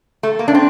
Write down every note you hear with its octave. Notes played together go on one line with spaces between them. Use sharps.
A3
A#3
D4
C4